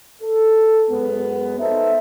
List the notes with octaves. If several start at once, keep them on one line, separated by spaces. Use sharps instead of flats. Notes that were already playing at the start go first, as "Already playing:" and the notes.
A4
F#2 G#3 B3
D#4 A4 B4 C5 E5